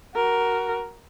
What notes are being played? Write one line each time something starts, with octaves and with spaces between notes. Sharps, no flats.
F#4 A#4